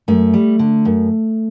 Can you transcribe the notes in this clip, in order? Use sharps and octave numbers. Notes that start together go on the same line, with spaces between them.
F#2 A3
G3
D3
F#2